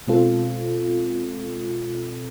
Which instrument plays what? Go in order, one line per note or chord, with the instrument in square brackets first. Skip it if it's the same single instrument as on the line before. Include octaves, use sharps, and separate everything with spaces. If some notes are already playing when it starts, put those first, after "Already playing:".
[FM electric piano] B2 G#3 C4 F4 A4